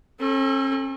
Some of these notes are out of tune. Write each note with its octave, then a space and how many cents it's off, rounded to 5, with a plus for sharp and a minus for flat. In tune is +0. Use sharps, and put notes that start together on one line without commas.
C#4 -45 A4 +0